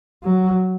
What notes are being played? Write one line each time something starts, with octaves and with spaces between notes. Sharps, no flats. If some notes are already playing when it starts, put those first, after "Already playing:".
F#3